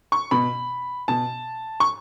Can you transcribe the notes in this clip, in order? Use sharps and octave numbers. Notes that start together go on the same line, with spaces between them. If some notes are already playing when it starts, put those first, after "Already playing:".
C#6
B2 B5
B2 A5
C#6